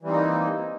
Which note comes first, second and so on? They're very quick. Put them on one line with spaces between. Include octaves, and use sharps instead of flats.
E3 G3 C4 D#4 A#3